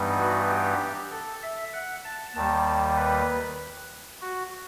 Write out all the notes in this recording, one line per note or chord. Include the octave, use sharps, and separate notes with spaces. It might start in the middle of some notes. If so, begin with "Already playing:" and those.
Already playing: G2 E3 G3 B3 D#4
F#4
G4
A4
E5
F#5
A5
D#2 D#3 G3 A5
B4
F#4